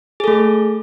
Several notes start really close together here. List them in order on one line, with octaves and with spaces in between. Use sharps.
G#4 A4 A3